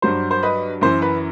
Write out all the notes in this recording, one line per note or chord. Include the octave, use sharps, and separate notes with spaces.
G2 F#3 C5
C5
B4 D#5
F#2 E3 C5
B4